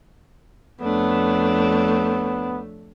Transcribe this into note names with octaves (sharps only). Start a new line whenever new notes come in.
F2 A3 B3 D4 C#5